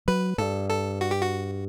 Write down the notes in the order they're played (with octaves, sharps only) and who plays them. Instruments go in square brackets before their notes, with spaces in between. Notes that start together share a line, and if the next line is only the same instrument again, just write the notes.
[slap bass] F#3 [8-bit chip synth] B4
[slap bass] G2 [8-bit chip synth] A4
[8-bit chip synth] A4
F#4
G4
F#4